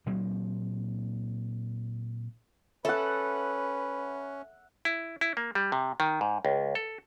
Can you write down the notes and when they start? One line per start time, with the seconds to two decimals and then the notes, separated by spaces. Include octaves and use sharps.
0.06 A#2 F#3 A#3 C4
2.85 C#4 A4 B4 E5 F#5
4.85 E4
5.21 E4
5.37 A#3
5.55 G3
5.72 C3
6.00 D#3
6.21 G#2
6.45 C#2
6.75 A4